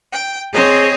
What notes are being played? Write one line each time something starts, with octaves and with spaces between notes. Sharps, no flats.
G5
C4 G#4 C5 C#5 D#5